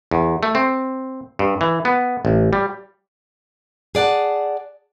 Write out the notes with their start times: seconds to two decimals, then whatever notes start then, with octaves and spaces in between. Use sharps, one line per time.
0.11 E2
0.43 A3
0.55 C4
1.39 G2
1.61 E3
1.85 B3
2.25 A1
2.53 G3
3.95 G#4 D5 F#5 A5